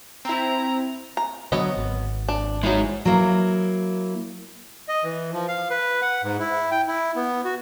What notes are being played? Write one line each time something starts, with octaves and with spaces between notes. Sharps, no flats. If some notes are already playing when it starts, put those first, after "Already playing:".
C4 E4 A#5
A#5
D3 F#3 B3 C#5 D#5
G#1
D4
E3 F#3 G#3 D#4 G#4
F#3 A#3 E4
D#5
E3
F3
F5
B4
F#5
G#2
E4
G5
E4
B3
F#4